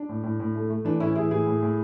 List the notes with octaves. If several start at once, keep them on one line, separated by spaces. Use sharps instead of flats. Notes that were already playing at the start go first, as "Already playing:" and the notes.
Already playing: D4
A2
A2
A2
A3
A3
E3 D4
A2 C#4 E4
E3 E4 G#4
A2 E4 G#4
A2
A2